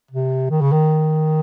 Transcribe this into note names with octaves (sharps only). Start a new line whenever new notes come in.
C3
D#3
C#3
D#3